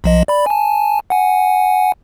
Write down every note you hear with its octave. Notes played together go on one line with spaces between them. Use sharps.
B1 F3 D#5
D5 B5
G#5 A5
F#5 G#5